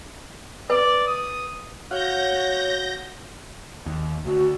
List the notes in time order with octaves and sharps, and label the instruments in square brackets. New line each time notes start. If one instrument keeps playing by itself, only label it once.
[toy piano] B4 [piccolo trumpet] D5
[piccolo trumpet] D#6
[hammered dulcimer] F#4 F5 F#5 [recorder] C#5 [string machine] G6 A#6
[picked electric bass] D#2
[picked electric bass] D2 [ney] F#4